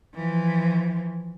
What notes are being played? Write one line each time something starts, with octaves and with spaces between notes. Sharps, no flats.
E3 F3